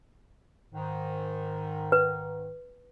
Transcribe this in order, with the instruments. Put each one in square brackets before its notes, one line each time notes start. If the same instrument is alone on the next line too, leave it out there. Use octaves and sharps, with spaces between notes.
[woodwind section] G#2 D#3
[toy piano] B4